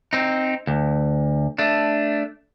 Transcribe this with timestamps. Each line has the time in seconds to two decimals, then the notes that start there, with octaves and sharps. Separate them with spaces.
0.13 C4 D#4
0.67 D2
1.58 A3 D4